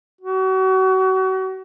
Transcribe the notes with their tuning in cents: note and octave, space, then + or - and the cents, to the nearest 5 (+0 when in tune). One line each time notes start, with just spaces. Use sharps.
F#4 +35